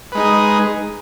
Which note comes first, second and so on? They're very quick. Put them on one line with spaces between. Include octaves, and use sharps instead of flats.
B4 G#3 D#4 G#4